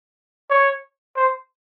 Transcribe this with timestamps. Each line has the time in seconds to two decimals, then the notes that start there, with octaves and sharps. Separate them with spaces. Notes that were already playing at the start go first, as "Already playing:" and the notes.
0.50 C#5
1.16 C5